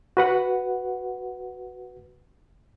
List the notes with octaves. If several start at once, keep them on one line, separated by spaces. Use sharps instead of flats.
F#4 B4 F#5